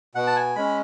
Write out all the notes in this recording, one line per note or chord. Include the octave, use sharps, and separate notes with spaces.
B2 F#5
A5
G#5
G#3 C#4 B5